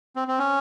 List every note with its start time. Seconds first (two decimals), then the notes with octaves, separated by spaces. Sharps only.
0.16 C4
0.28 C4
0.39 C#4